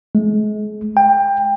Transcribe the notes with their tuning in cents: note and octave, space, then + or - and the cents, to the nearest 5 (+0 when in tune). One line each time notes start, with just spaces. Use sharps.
G#3 +35
G5 +20